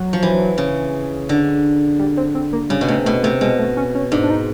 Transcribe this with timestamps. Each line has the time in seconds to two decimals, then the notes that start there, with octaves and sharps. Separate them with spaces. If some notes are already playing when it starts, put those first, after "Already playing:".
Already playing: F#3
0.13 F3
0.23 E3
0.58 C#3
1.29 D3
1.99 G3
2.17 C4
2.35 C4
2.53 A#3
2.70 C#3 G3
2.81 B2
2.88 C3 A3
3.05 B2 A3
3.23 C3 A3
3.41 B2 G#3
3.59 A3
3.77 C#4
3.95 C#4
4.12 G#2 D4
4.23 D4
4.30 D#4